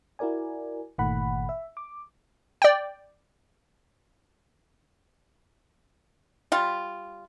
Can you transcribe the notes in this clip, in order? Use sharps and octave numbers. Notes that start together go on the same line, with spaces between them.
E4 F#4 A#4 D5 G#5
G1 A#2 D#3 A3 F#5 B5
E5
D6
D5 G5
G3 F4